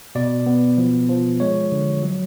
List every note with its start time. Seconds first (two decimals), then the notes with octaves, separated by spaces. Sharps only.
0.15 B2 D5
0.46 B3
0.78 F3
1.09 F3
1.40 G#3 C#5
1.72 D3
2.03 F#3